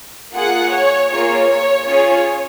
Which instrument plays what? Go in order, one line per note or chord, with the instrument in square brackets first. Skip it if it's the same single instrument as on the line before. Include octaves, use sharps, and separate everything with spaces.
[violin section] A#3 F4 G#4 F#5
C#5
A#3 F4 G#4 C#5
C#5
C#4 F4 G#4 C#5